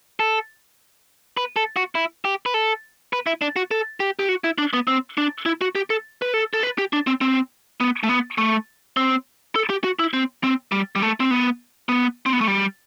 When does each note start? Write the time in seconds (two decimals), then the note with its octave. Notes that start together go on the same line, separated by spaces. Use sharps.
0.20 A4
1.37 B4
1.56 A4
1.76 F#4
1.95 E4
2.25 G4
2.46 B4
2.54 A4
3.13 B4
3.27 E4
3.42 D4
3.56 F#4
3.71 A4
4.00 G4
4.19 G4
4.29 F#4
4.44 E4
4.58 D4
4.73 B3
4.87 C4
5.18 D4
5.46 E4
5.61 F#4
5.75 G4
5.90 A4
6.22 B4
6.34 A4
6.54 A4
6.63 B4
6.78 G4
6.93 D4
7.07 C4
7.21 C4
7.80 B3
8.03 A3
8.09 B3
8.38 A3
8.97 C4
9.56 A4
9.70 G4
9.84 F#4
9.99 E4
10.13 C4
10.44 C4
10.72 G3
10.95 G3
11.02 A3
11.20 C4
11.31 B3
11.89 B3
12.26 C4
12.33 B3
12.41 A3
12.47 G3